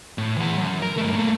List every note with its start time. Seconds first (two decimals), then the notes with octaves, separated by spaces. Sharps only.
0.18 A2
0.38 E3 F#5
0.58 F#2
0.82 A#4
0.97 G2 A3
1.14 A3 A#3